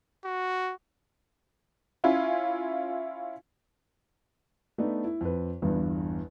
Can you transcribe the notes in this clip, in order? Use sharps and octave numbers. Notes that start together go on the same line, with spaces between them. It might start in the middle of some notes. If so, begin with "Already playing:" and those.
F#4
C#4 E4 F4
A3 B3 D4 D#4
E4
F2 B4
G1 E2 G2